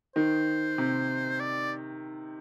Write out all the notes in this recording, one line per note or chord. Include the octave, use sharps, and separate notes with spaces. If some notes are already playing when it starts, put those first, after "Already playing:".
D#3 C5
C3
D5